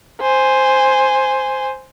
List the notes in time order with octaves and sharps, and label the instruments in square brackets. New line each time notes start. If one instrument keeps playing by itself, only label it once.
[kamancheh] C5 G#5